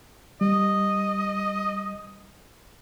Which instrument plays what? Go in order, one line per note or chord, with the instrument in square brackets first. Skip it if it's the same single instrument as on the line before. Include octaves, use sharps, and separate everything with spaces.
[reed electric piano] G3 [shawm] D#5